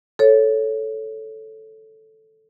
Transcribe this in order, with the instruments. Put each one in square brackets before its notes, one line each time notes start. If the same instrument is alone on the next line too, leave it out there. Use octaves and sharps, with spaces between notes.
[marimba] A4 C#5